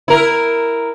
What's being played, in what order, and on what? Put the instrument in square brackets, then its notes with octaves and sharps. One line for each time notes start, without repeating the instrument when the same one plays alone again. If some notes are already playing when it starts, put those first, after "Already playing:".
[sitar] E4 A#4